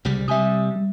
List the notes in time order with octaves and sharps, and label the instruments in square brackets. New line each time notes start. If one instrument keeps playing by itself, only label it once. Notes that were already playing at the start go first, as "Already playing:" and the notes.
[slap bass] C2 C#3 G3
[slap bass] C3 G3 [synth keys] E5 G#5 D#6
[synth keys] G3